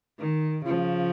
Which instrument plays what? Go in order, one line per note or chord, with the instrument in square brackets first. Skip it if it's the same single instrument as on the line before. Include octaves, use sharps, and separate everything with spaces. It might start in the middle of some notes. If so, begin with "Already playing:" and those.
[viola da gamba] D#3
C#3 F3